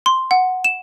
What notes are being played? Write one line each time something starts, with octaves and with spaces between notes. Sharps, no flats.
C6
F#5
E7